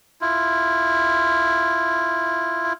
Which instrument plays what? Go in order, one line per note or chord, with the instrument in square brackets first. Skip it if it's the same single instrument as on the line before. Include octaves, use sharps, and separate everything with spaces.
[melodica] E4 F4